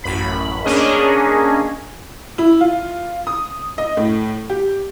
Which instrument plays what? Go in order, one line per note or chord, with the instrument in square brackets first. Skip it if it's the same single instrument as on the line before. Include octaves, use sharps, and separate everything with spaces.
[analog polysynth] A1 F#2 B5
A#3 C#4 D4 G#4 D#5
[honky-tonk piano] E4
F4
D#6
D#5
A2
G4